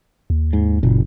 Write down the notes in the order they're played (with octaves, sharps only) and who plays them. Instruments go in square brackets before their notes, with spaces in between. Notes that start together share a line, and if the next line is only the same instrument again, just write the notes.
[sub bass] D#2
[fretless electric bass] G#2
[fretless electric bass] F#1 [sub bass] A#2